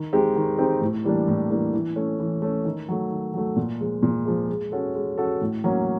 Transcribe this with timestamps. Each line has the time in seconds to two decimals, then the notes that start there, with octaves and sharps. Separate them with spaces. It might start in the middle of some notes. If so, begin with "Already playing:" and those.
Already playing: D#3
0.13 G#3 C4 D#4 G4
0.36 D#3
0.58 G#3 C4 D#4 G4
0.81 A2
1.04 E3 G3 A#3 D4
1.28 A2
1.50 E3 G3 A#3 D4
1.73 E3
1.96 A3 C#4
2.20 E3
2.42 A3 C#4
2.65 D#3
2.89 F#3 A3
3.11 D#3
3.34 F#3 A3
3.56 A#2
3.80 F3 G#3
4.03 A#2
4.26 F3 G#3
4.49 G#3
4.72 C#4 F#4 A4
4.95 G#3
5.18 C#4 F#4 A4
5.41 A2
5.64 F#3 A#3 C#4